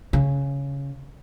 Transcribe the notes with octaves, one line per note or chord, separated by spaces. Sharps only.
C#3